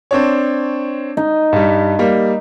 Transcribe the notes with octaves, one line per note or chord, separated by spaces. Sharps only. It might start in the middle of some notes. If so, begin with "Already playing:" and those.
C4 D4 C#5
D#4
G2 G3
G3 A#3